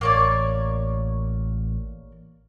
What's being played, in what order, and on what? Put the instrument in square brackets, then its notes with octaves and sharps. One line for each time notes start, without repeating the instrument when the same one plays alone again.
[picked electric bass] A1 [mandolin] A#3 C#5 D5